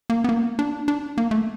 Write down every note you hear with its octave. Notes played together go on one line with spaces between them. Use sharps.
A#3
B3
A#3
D4
D4
A#3
A3